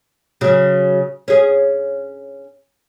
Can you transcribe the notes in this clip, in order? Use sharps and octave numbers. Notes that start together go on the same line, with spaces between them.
C#3 F#3
C#4 G#4